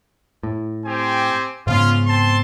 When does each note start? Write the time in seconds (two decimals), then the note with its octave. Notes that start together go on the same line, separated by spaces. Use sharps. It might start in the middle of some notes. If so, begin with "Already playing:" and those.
0.43 A2
0.85 C4 G4 G#5
1.67 G#2 C#3 B3 C#4 F4
2.06 C4 A5 C6